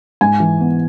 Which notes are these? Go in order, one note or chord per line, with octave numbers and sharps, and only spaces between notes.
G#2 G#5
E3
B3